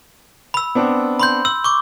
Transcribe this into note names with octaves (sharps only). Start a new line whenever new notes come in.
B5 E6
B3 C4 D4
B5 C6 G6
E6 F#7
C#6 D6